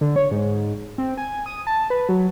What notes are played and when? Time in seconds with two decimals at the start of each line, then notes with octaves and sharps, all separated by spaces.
0.01 D3
0.16 C#5
0.31 G#2
0.98 C4
1.18 G#5
1.46 D#6
1.67 A5
1.90 B4
2.09 F#3